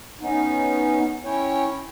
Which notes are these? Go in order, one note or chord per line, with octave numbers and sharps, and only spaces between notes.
B3 C#4 D#4
C#4 E4 C#5 G5